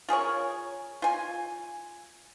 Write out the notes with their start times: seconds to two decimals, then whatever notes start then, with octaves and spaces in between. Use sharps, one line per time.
0.09 F4 G#4 A#4 C#5
1.02 F4 G#5